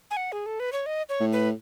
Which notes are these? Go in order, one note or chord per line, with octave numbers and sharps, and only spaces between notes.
G#5
F#5
G#4
A4
B4
C#5
D#5
C#5
A2
B4